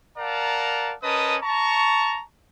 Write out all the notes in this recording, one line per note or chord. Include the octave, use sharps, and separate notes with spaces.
A#4 D5 F5 F#5 A5 A#5
C#4 A#4 B4 D#5 A5 D#6
A5 A#5 C#6